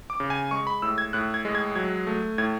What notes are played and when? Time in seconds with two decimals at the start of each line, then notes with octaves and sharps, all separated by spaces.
0.10 D6
0.20 C#3
0.30 G#5
0.51 G#3 C#6
0.67 B5
0.82 A2 E6
0.98 G#6
1.13 A2 F#6
1.34 G#6
1.45 G#3
1.55 G#6
1.75 F#3 G#6
2.07 A3
2.38 A2 G#6